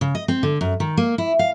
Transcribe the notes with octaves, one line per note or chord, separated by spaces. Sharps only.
C#3
D#5
C4
D3
F#2
D#3
A#3
E4
F5